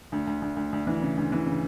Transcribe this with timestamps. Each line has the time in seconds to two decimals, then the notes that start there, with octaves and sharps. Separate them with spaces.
0.12 D2
0.27 D2
0.42 D2
0.56 D2
0.73 D2
0.87 E3
1.02 C#3
1.17 D2
1.32 E3
1.47 C#3